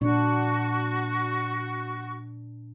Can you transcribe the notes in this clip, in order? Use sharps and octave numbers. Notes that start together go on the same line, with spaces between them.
A#2 D4 F#4 C#6